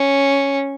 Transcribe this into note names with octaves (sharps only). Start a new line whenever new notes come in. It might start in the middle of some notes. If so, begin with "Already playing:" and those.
Already playing: C#4